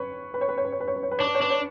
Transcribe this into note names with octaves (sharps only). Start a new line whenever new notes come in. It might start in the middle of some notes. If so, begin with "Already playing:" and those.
Already playing: B4 C#5
B4
C#5
B4
C#5
B4
C#5
B4
C#5
B4
C#5
B4
D4 C#5
B4
C#5
D4 B4
C#5